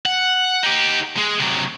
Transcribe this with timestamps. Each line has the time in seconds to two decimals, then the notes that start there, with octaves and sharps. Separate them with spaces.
0.05 F#5
0.63 D#4 G4
1.18 G#3
1.40 C3 F#3